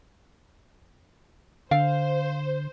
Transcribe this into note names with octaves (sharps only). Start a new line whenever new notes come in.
D3 C5 F5